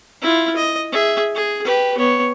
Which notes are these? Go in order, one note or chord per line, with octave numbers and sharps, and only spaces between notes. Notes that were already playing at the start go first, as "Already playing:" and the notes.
E4 F4
D#5
G#4 E5
G#4
G4 B4
B3 C#5